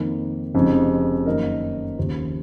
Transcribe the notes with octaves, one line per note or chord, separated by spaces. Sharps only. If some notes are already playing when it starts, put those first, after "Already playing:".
Already playing: F2 D#3 A#3
F1 F2 C#3 G#3 D#4
F#2 D#3 A#3 D#4 A#4
D#2 C#3 F3